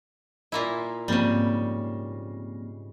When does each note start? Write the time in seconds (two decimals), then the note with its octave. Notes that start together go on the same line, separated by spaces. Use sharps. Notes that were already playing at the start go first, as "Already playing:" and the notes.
0.52 A#2 A#3 E4
1.08 G#2 C#3 F3 G3 A#3 C4